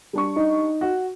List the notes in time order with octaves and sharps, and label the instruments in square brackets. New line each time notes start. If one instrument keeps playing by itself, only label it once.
[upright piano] G3 D4 C#6
[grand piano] D#4
[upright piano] F#4